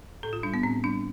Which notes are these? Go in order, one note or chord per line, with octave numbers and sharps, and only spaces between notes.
A2 A4
F4
G3 D4
B3
A2 C4
G3 D4